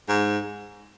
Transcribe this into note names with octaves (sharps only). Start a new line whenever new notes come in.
G#2